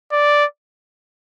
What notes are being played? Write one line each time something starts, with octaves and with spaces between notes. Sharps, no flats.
D5